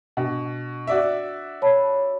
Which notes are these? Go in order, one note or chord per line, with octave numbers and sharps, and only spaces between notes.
B2 D4
F#4 D5 E5
C#5 A5 B5